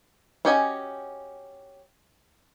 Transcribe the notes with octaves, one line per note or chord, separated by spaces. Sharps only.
C#4 F#4 G4 D#5 G#5